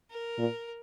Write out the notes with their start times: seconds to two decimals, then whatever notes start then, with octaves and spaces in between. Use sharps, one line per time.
0.10 A#4
0.38 A#2